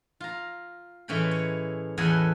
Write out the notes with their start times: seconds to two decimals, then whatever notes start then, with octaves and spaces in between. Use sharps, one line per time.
0.20 F4 A#5
1.08 A2 E3 G#3 C#4 G5 B5
1.31 C#5
1.98 E2 A2 A4 B4 D#5 G#5